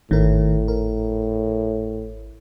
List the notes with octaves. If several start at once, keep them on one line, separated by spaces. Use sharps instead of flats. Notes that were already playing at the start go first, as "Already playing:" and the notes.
G#1 A2 D#3 A#4
A#4